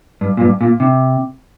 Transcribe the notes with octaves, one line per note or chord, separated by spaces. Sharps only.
G2
A#2
G2
A#2
C3